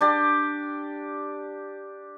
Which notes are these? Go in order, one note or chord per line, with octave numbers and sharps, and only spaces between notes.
D4 G4 D5